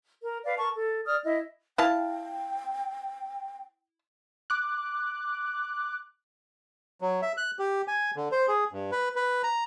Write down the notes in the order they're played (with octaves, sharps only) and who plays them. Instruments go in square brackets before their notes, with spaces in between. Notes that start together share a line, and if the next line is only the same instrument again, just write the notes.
[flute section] A#4
B4 D5 F5
A#4 A5 C#6
A4
D5 D#6 F6
E4 D#5
[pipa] E4 F5 A5 [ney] G5
[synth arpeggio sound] D6 F#6
[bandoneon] F#3
E5
F#6
G4
G#5
D3
C5
G#4
G2
B4
B4
A#5